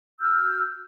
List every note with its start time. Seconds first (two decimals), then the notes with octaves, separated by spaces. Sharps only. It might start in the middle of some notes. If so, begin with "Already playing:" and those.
0.21 F#4 E6 F6 G6